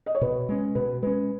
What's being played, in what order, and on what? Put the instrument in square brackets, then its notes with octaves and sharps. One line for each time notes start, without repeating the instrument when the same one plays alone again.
[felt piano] D#5
C#5
[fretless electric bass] B2 [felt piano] B4
[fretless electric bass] G#3 C#4
[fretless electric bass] B2 [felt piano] B4
[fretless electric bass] G#3 C#4 [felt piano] B4